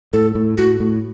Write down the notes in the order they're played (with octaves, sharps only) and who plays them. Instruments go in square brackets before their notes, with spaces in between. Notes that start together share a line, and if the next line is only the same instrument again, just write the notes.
[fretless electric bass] A2 [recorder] A4
[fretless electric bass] A2
[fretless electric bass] A2 [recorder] F#4
[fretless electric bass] A2